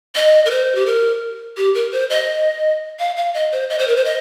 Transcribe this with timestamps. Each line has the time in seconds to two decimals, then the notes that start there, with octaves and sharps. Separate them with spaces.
0.15 D#5
0.46 A#4
0.51 C5
0.75 G4
0.86 A#4
1.57 G4
1.75 A#4
1.92 C5
2.10 D#5
2.99 F5
3.17 F5
3.34 D#5
3.52 C5
3.70 D#5
3.79 C5
3.88 A#4
3.96 C5
4.05 D#5